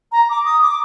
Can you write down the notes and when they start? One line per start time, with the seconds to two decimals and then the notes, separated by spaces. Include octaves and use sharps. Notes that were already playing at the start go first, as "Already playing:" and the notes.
0.11 A#5
0.30 D6
0.44 D#6
0.61 D6